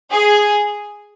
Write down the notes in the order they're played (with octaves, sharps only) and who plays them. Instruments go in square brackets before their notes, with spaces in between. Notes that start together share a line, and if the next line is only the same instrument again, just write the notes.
[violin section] G#4